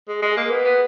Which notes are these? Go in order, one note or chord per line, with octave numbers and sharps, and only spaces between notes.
G#3
G#3
A#3
B3
B3